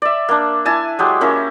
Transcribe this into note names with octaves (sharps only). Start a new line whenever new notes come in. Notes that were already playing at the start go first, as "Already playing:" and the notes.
D5 E5
A#3 D4
E4 G#5 A5
F#3 G#3 G4
A#3 C#4 E4 A#4